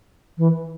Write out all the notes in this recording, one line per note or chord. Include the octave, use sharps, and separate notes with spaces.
E3